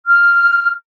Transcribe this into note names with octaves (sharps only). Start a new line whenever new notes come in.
F6